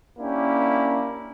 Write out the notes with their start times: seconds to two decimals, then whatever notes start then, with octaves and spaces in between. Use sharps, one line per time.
0.18 A#3 C#4 D4 E4 G4